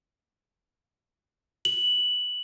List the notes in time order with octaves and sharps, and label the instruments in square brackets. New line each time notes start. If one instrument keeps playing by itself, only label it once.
[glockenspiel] F#7